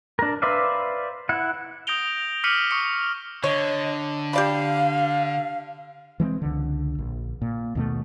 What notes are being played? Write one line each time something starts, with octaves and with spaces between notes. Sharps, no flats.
D4 A#4
B4 C5 D5 E5 F5
E4 F#5
D#6 G6 A#6 D7 F7 G7
D6 F6 B6 C#7 D#7 F#7
C#6 D#6 C#7
D3 C#5 D#5
G4 D5 F5 B5
E3 G#3 A#3 C4
C#2 D3
A#1
A#2
D#2 B2 A3